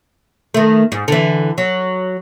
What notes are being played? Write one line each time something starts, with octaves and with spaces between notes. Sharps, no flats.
D#3 A3
G#2
D3 E3
F#3